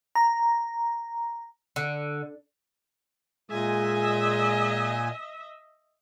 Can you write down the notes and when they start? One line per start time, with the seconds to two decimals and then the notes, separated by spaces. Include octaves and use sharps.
0.15 A#5
1.76 D3
3.50 A#2 G#3 D#5 E5 G#5